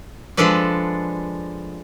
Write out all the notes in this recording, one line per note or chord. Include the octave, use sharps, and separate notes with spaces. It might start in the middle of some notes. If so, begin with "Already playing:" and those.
F3 G#3 D4 A4 B4 D5